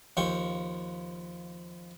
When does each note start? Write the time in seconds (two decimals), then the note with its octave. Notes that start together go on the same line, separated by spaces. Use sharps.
0.17 D#2 F3 G5 C#6